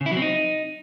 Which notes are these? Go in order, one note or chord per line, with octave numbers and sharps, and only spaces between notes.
C#3
E4
F#3
C4
D#4